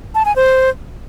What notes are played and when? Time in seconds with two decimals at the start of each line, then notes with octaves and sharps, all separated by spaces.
0.15 A5
0.25 G#5
0.36 C5